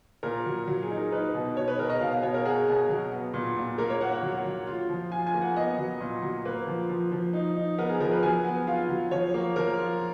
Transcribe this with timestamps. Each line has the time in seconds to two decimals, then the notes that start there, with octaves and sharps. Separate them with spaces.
0.23 A#2 A#4
0.46 F#3
0.68 F#3
0.82 G#4
0.90 D#4
0.97 A#4
1.12 D#4 B4
1.34 B2
1.57 B2 C#5
1.68 B4
1.79 B2 A#4
1.90 D#5
2.00 B2 F5
2.12 F5
2.23 B2 C#5
2.34 A#4
2.45 F#4 G#4
2.68 B2
2.89 F#3
3.12 B3
3.34 A#2
3.57 A#2
3.78 A#3 A#4
3.90 C#5
4.01 A#3 F#5
4.12 F#5
4.23 F#3
4.45 F#3
4.67 F4
4.90 F3
5.11 F4 G#5
5.27 G#5
5.34 A#3
5.41 F#5
5.56 B3 D#5
5.78 F#3
6.01 A#2
6.23 F#3
6.45 A#3 B4
6.67 F3
6.89 F3
7.12 F3
7.33 D#4
7.57 D#4
7.78 B3 A#4
7.89 G#4
8.00 F3 A#4
8.11 B4
8.23 F#3 G#5
8.44 B3
8.67 F4 F5
8.89 F#3
9.11 F3 C#5
9.34 A#3
9.56 F3 A#4
9.78 F4